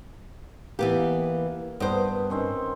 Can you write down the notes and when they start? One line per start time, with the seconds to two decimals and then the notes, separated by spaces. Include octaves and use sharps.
0.79 E3 A#3 B3 G4
1.80 G2 B3 C5
2.30 D#3 C4 C#4